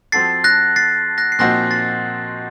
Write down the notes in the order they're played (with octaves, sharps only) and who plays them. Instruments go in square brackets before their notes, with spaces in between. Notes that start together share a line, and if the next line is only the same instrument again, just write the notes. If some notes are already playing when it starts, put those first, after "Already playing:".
[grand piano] F3 C4 F#4 A4 [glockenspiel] A6 C7
[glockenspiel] F#6 A#6
A6 C7
F#6 A#6
C7
[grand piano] A#2 F3 C4 D#4 F#4 [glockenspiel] F#6 A#6
[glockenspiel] A6 C7